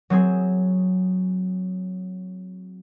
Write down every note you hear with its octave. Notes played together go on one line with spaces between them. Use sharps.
F#3 C4 G#4